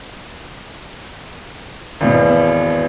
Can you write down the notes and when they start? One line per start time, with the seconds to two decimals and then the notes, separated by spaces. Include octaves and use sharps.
2.01 G#1 E2 B2